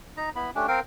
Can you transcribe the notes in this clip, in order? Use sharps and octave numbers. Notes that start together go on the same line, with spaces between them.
D#4 A#5
B3 E4 B5
A3 C#4 D4 G4
C4 A#4 F5 G5